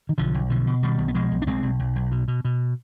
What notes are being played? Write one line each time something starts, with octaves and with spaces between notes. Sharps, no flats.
D#3
B1 D3 F3
B1
B2 D3 F3
B2
B2 D#3 G3
B1
B3
B2 F3 G#3
B1
D4
B1 G#3 C4
B1
B1
B1
B2
B2
B2